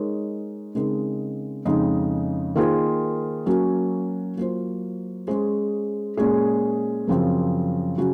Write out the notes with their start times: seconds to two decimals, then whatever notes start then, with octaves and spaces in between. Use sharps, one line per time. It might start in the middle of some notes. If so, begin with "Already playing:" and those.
Already playing: G#3 D#4 A#4 C#5
0.75 C#3 G#3 C4 D#4 A#4
1.65 F2 C#3 G#3 D#4
2.55 D#3 A#3 F4 G#4 C5
3.46 F#3 A#3 C#4 F#4
4.37 F#3 A#3 F4 C5
5.27 G#3 C#4 G#4 C5
6.17 A#2 G#3 C#4 G#4
7.07 F#2 C#3 F3 C4
7.98 C#3 F#3 C#4 F#4